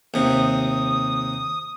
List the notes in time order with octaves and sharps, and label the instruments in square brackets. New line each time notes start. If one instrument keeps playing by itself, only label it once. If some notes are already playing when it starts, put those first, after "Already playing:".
[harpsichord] D#2 C3 [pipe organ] D#6